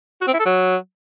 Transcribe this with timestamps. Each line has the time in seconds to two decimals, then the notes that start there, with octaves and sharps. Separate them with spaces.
0.21 F#4
0.27 C4
0.33 E4
0.39 A4
0.45 F#3